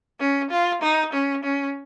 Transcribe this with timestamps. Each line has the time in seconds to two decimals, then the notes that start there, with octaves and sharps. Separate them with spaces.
0.20 C#4
0.51 F4
0.82 D#4
1.13 C#4
1.44 C#4